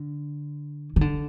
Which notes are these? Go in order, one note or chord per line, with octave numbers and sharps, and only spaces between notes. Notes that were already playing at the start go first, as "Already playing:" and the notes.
Already playing: D3
D#3
D3